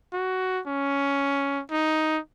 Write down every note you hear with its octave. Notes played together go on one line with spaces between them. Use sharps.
F#4
C#4
D#4